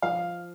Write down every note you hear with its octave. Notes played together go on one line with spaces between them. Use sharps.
F3 F5